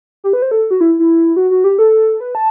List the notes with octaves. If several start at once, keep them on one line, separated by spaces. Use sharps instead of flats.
G4
B4
C5
A4
F#4
E4
E4
F#4
F#4
G4
A4
B4
A5